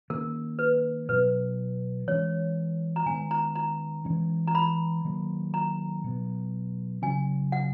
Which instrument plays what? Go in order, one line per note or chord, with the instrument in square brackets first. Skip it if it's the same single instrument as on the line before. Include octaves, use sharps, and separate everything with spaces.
[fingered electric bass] D#3 A#3 C#4 [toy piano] A#4
[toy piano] B4
[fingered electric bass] B2 F#3 B3 [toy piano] B4
[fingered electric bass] E3 G#3 C#4 [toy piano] C#5
[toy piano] A#5
[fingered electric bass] D#3 G#3 B3 [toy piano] G#5
[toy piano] A#5
A#5
[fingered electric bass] E3 G#3 C#4
[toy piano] A#5
B5
[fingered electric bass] D#3 F#3 A#3
[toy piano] A#5
[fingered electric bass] B2 F#3 B3
[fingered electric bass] C#3 F#3 C#4 [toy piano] G#5
[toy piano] F#5